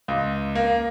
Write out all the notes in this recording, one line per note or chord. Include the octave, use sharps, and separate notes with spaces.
C#2
A#3